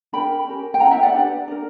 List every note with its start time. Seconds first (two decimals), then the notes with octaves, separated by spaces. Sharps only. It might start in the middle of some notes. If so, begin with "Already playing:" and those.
0.13 D4 A#4 G5 B5
0.47 C#4 G4 A#4
0.74 G5
0.80 C#4 E4 B4 F#5 A#5
0.91 E5 G5
1.03 D5 F#5
1.14 D4 G4 B4
1.48 D4 A#4